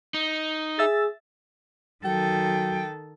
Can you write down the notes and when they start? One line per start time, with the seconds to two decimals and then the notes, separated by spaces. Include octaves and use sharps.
0.14 D#4
0.79 G#4 E5 E6 A6
2.05 D#3 F#3 A4 G5